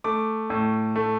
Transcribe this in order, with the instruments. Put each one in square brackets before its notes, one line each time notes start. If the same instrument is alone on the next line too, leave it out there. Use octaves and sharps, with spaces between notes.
[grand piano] A3 D6
A2
A3